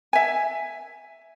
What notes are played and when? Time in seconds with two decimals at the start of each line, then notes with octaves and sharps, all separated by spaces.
0.13 E5 G#5